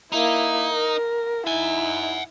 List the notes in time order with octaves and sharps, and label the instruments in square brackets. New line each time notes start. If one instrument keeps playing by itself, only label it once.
[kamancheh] A#3 E4 [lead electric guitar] D#4
[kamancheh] A#4
[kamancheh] D#4 E4 [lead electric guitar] F#5 G#5